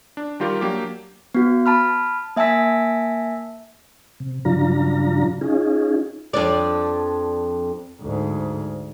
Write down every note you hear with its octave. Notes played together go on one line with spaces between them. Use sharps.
D4
D#3 G3 F4 G4 A#4
F#3 A#3 D4 G4
B3 F#4
A5 B5 F6
A#3 E5 G#5 A5 E6 B6
C3
G2 C#3 F#3 D4 F4 A#5
C#4 D#4 F4 G#4
F2 D4 D5
D2 G#2